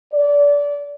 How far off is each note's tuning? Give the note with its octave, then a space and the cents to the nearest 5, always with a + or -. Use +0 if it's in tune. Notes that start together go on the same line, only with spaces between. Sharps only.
D5 -25